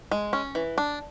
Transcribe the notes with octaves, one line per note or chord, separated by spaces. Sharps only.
G#3
C#4
E3
D4